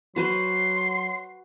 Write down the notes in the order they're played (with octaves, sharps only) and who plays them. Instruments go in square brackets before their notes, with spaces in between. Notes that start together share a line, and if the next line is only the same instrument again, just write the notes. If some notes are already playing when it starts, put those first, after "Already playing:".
[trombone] F#3 [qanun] F#4 B4 C5 [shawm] C6